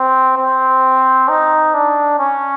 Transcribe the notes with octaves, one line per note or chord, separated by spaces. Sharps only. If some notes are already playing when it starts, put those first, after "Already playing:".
Already playing: C4
C4
D#4
D4
C#4